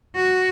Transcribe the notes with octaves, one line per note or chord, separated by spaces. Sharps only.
F#4